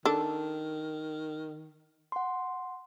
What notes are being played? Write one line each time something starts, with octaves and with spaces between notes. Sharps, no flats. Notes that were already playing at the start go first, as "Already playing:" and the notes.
D#3 D4 A4
F#5 C6